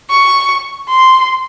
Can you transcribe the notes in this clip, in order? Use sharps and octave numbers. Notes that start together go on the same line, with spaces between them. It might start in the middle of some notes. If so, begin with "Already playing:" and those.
C#6
C6